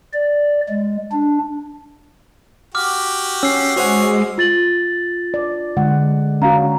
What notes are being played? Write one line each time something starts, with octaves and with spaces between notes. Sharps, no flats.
D5
G#3
D4
F#4 G4 D6 F6
C#4 E6 C7
G#3 F#4 G#4 C5 C#5 F#5
F4 A6 F#7
D5
D3 G#3 F#5
C#4 F#4 F5 A#5